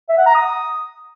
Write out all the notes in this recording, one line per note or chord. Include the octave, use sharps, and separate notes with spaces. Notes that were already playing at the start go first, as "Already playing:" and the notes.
E5
F#5
A#5
D#6